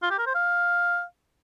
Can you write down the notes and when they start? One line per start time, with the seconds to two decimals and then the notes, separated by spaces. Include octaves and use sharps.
0.02 F4
0.10 G4
0.19 A#4
0.26 C5
0.35 F5